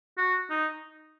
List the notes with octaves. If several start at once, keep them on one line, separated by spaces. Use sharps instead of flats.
F#4
D#4